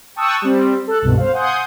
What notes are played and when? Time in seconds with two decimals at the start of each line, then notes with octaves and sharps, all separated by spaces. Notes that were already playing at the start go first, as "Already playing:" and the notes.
0.16 G5 A5 C#6 D#6 E6 F#6
0.42 G3 C4
0.87 A4 F#6
1.02 C2 G2 B2
1.17 C5 F5
1.33 F#5 G#5 C6 D#6 G6